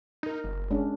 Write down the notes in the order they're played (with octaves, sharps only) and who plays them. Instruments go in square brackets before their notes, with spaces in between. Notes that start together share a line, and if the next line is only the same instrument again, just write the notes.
[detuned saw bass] D#4 [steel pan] A#4 D#5
[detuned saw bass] F#1
[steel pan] G#3 C#4 D4